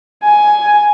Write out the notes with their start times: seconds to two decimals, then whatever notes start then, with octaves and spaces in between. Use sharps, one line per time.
0.24 G#5